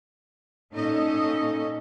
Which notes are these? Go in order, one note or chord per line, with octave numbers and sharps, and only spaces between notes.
A#2 C#4 D#4 A4 D#5